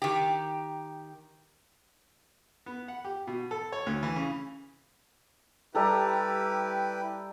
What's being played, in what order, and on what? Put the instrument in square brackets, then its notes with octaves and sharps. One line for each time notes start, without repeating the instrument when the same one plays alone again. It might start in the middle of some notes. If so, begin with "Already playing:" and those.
[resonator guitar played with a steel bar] D#3 G4
[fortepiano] B3
F#5
G4
B2
A4
C#5
D2
E3
C#3
[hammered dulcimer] G3 A4 A#5 [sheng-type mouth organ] E4 G4 B4